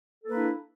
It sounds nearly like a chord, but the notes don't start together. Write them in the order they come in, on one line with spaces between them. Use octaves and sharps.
A4 A#3 B4 D4 E4